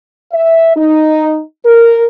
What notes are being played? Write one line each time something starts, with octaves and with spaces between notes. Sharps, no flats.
E5
D#4
A#4